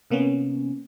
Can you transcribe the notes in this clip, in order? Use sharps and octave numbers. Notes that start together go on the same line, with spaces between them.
C3 A#3 B3 C#4